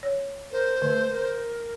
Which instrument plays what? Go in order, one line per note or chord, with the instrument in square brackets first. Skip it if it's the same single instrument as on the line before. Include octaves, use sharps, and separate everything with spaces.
[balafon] C#5
[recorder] A#4 [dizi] C5
[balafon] D3 [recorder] A3
[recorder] A#4